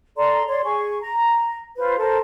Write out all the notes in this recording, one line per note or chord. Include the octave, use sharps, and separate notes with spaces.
A4 D5 A#5 C6
C#5 D5 C6
G#4 C#6
A#5
F4 B4 C5
A4 A#4 C5 A5